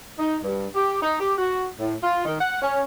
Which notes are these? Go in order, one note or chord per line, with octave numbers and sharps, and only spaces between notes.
D#4
G2
G4
D#4
G4
F#4
A2
F4
D#3
F#5
C#4